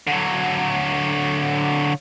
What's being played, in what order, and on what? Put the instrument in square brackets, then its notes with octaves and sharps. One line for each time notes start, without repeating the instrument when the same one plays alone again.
[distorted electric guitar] D3 F#3